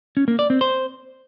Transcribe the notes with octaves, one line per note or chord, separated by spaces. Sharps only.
C#4
A#3
D5
C4
C5